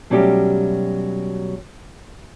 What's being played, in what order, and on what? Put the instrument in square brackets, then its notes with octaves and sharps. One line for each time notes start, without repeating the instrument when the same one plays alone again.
[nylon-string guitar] B2 F#3 G3 A3 C#4 G4